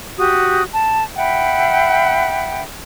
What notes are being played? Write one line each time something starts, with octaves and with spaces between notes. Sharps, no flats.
F#4 G4 D#6
A5
E5 F#5 G5 B5